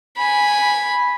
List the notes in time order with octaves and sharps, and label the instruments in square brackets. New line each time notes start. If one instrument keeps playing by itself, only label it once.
[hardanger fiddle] G#5 B5